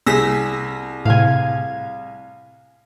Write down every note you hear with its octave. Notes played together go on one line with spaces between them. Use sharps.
C2 G#4 E6 A#6 B6
A2 C3 F5 G#5